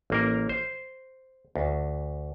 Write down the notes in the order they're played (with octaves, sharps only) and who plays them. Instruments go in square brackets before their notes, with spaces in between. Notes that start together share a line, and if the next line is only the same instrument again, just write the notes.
[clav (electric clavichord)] A1 A#3 A#4
C5
D2